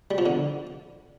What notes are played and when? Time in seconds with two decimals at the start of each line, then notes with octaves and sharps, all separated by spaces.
0.11 G3
0.18 F3
0.26 D3